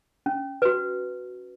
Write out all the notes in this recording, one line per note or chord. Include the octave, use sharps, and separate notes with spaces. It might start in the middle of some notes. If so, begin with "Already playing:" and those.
C#4
F#4 B4